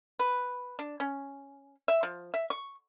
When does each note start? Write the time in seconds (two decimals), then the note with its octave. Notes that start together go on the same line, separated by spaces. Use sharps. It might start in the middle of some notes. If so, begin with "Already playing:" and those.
0.19 B4
0.79 D4
1.00 C#4
1.88 E5
2.03 F3
2.34 E5
2.50 C#6